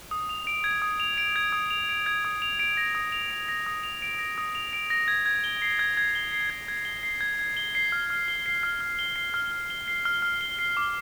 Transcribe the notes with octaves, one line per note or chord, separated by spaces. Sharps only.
D#6
F7
D7
G#6
D#6
F7
D7
G#6
D#6
F7
D7
G#6
D#6
F7
D7
A#6
D#6
F7
D7
A#6
D#6
F7
D7
A#6
D#6
F7
D7
A#6
G#6
G#6
G7
C7
G#6
G#6
G7
C7
G#6
G#6
G7
C7
G#6
G#6
G7
C7
F6
F6
G7
C7
F6
F6
G7
C7
F6
F6
G7
C7
F6
F6
G7
C7
D6